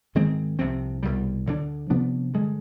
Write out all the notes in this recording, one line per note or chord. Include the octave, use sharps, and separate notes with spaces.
G#2 D#3 G#3 C4
C2 C3 F3 C4
C2 B2 G3
D2 D3 G#3 D4
C3 F3 B3 D4
G2 D3 G#3